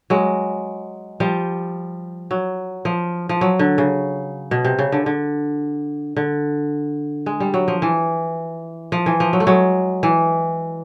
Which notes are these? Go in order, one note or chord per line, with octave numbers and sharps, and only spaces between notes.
F#3 G#3
F3 G3
F#3
F3
F3
F#3
D3
C#3
B2
C3
C#3
D3
D3
D3
G#3
G3
F#3
F3
E3
F3
E3
F3
F#3
A3
F#3 G#3
E3